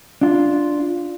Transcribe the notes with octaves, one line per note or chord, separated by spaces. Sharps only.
D4 F4